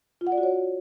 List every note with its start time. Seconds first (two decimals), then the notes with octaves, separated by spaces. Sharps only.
0.21 F4
0.27 F#5
0.32 D5
0.38 F#4
0.43 C#5